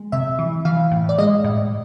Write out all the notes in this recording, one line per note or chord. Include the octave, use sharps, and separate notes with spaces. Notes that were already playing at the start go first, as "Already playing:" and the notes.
Already playing: G#3
C3 E5
E3
E3 F5
A2
D5
G#3 D#5
A2